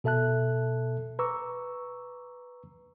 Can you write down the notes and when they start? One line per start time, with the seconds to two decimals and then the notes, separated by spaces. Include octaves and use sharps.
0.04 B2 A4 E5 A5 F#6
1.19 B4 A#5 C#6 D6 E6